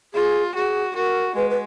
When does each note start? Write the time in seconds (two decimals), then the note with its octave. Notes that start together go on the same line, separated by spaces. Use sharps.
0.14 F4 G#4
0.54 F#4 G#4
0.95 F#4 A#4
1.35 G#3 B4
1.50 B4